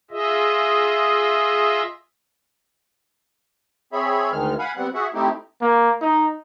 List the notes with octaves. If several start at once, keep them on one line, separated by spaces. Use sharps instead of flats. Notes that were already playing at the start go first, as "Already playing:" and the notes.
F4 G#4 D#5 E5
C4 G#4 C#5 E5 B5
D2 D#3 G#3 F6
F5 F#5 G#5 B5
G3 B3 C4 F#5
F#4 G#4 E5 F#5
A3 C4 D#4 E4 G4
A#3
D#4